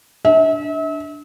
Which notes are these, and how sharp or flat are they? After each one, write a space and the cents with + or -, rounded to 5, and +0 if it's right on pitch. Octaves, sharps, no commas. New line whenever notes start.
D4 +0 E5 -40